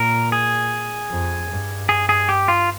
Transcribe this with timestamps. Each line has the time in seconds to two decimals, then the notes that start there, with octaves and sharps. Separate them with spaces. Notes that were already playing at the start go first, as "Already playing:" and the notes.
Already playing: A#2 A#4
0.32 G#4
1.11 F2
1.50 G2
1.89 G#4
2.09 G#4
2.29 G4
2.48 F4